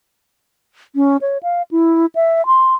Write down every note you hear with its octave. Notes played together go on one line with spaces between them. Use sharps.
C#4
C#5
F5
E4
E5
C6